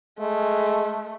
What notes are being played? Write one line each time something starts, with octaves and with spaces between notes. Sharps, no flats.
G#3 A3